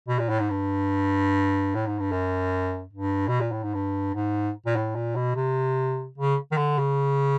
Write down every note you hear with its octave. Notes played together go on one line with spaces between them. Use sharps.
B2
A#2
A2
G#2
G2
A2
G#2
G2
F#2
G2
B2
A#2
A2
G#2
G2
G#2
A#2
A2
A#2
B2
C3
C#3
D#3
D3
C#3